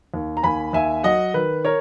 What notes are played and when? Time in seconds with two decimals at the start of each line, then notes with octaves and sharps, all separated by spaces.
0.14 D#2
0.37 A#5
0.43 D#2 G#5 B5
0.73 D#2 E5 G#5
1.04 F#3 D#5 F#5
1.34 D#3 B4
1.65 A#4 C#5